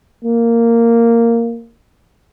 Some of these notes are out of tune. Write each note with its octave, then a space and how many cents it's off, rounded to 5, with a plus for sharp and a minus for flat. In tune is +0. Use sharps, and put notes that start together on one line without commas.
A#3 -10